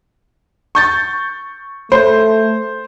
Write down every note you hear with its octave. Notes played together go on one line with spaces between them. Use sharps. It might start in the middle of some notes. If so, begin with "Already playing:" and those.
C#6 G6 A6
A3 C5